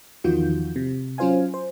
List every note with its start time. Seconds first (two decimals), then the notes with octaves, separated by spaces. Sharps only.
0.24 E2 D#3 F3 F4 F#4 G6
0.76 C3
1.18 F#3 C#4 F4 C5 F5 G#5
1.54 C5